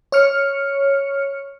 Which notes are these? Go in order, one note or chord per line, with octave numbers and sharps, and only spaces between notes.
C#5 C#6 F6 C#7